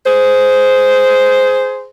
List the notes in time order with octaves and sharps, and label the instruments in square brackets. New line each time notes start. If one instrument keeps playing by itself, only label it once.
[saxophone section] G#4 C5